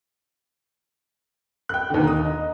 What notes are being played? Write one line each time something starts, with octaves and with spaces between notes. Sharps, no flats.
G5 F#6
D#2 D3
A#5 D#6
D#5